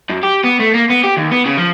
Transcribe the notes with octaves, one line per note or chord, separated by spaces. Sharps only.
F#2
G4
B3
A3
A#3
B3
G4
D#2
B3
C#3
F3